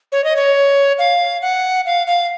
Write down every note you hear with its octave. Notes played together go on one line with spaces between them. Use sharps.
C#5
D#5
C#5
F5
F#5
F5
F5